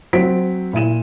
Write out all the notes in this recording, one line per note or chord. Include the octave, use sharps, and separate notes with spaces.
F#3 C4 B6 D7
A#2 E4 D#7 E7